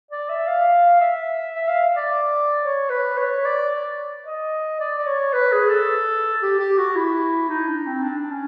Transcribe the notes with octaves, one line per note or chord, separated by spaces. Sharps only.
D5
E5
F5
E5
E5
F5
D5
C#5
B4
C#5
D5
D#5
D5
D5
C#5
B4
G#4
A4
G4
G4
F#4
E4
D#4
D4
C4
D4
C#4